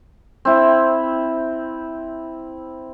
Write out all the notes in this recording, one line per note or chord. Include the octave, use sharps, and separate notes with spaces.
C4 E4